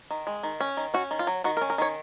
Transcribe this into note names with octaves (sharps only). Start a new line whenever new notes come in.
D#3
G#3
D#3
C#4
D#3
C#4 F#4
D#3
F4
F#3
D#3 F#4
A#4
C#4
A#4
D#3 C#5